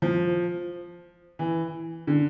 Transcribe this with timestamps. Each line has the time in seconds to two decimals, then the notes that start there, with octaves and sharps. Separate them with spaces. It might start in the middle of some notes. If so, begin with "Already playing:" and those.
0.02 F3
1.39 E3
2.07 D3